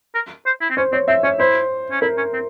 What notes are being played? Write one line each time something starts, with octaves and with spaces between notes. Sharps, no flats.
A#4
C5
E4
C4
C#4 C5
C4 C#5
C4 E5
C#4 C#5
E4 C5
C#4
E4 A#4
C#4
C4